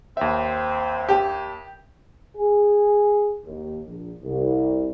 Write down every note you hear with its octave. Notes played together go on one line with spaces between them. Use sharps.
D#2 C4 E5
G4
G#4
D#2
A#1
C2